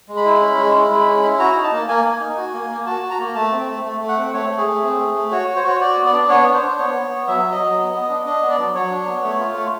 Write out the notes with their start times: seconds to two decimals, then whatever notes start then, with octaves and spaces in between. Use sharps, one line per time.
0.08 G#3
0.17 B5
0.25 E4
0.41 C#4
0.58 G#3
0.74 E4
0.90 G#3
1.06 C#4
1.23 E4
1.39 F#4 A#5
1.55 D#4
1.64 A5
1.72 A#3
1.88 A#3 G#5
2.04 A#3
2.20 D#4
2.37 F#4
2.53 A#3
2.70 A#3
2.86 F#4 A5
3.03 F#4
3.10 A#5
3.19 A#3
3.35 A3 A5
3.52 C4
3.68 A3
3.85 A3
4.01 A3
4.09 F#5
4.17 C4
4.34 A3 C#5
4.50 A3
4.58 G#4
4.66 A3
4.82 C4
4.99 A3
5.15 A3
5.31 F#4 C#5
5.48 F#4
5.56 C5
5.64 F#4 C#5
5.81 F#4 D5
5.97 B3
6.05 D5
6.13 D4
6.29 B3 C#5
6.46 D4
6.54 C5
6.62 D4
6.79 B3 C#5
6.95 B3
7.11 B3
7.28 F#3 E5
7.44 F#3
7.52 D#5
7.60 F#3
7.77 B3
7.93 B3
8.09 D4
8.26 D4 D#5
8.42 B3
8.50 D5
8.58 F#3
8.75 F#3 C#5
8.91 D4
9.07 B3
9.24 A3
9.40 F4
9.56 A3